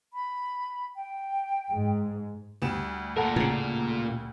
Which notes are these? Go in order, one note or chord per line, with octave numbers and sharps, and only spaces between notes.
B5
G5
G#2
D2 G3 E7
A#2 A4 A#4 F#5 A#5
A2 C#3